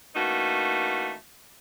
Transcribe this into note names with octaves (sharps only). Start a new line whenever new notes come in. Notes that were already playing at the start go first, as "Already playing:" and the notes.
E3 A3 A#3 C#4 D#4 F#4